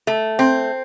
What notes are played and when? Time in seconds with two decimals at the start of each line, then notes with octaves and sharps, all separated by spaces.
0.07 A3
0.39 C4